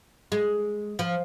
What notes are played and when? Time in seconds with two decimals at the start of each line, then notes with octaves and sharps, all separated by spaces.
0.32 G#3
0.99 F3